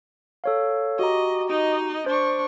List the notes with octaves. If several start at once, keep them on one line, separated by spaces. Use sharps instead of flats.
A4 C#5 F5
F#4 G4 D#5 A#5
D#4 D#5
D4 C5 C#6